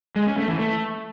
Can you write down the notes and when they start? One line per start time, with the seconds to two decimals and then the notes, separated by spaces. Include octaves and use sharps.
0.16 G#3
0.26 C#4
0.37 A3
0.48 E3
0.59 A3